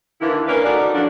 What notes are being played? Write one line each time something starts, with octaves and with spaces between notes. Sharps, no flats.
D#2 D3 E3 A#3 E4 G4
A#3 C#4 D4 A#4 B4
D#4 F#4 A4 B4 D5
D3 F3 F#3 C#4 D4 F#4